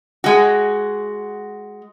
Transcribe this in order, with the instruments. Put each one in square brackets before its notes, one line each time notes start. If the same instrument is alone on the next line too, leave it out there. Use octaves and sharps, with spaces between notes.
[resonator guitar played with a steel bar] G#3 F#4